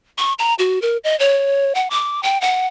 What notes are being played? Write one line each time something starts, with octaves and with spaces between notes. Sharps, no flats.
C#6
A#5
F#4
A#4
D#5
C#5
F#5
D6
G5
F#5